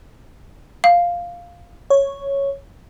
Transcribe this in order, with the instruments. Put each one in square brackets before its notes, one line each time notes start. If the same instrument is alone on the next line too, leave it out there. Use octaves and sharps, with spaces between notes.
[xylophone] F5
[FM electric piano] C#5